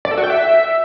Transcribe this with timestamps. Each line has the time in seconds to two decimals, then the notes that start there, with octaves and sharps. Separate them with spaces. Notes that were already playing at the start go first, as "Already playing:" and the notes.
0.05 D5
0.11 A4
0.17 F#4
0.24 G5
0.30 E5